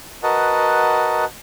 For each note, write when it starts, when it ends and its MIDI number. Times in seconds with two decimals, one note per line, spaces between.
0.23 1.25 66
0.23 1.25 70
0.23 1.25 71
0.23 1.25 75
0.23 1.25 78
0.23 1.25 81